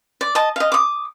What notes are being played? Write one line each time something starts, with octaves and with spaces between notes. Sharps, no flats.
D5
D#5 A5
D#5 F5
D6 D#6